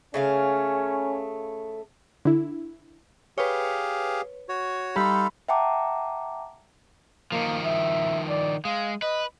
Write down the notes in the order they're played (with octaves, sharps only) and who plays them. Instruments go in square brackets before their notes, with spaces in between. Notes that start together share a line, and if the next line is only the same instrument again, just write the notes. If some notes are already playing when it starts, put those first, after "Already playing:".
[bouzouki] C#3 A3 F5 [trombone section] C#4
[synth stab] D3 E4
[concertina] G4 G#4 F5 [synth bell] B4 C#5
[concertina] F#4 C#5
[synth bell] G3 G4 [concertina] D#4 A4 F5 [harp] B5 C6
[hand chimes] E5 F#5 G5 A5 A#5 D6
[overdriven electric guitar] D#3 F3 [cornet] A#3
[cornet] E5
D5
[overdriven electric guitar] G#3 [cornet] F5
[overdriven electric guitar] B4 [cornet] D#5